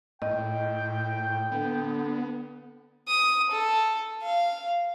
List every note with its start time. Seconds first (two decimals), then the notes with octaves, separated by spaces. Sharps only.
0.22 A2 D#5 G5
1.52 D3 B3
3.09 D#6
3.51 A4
4.23 F5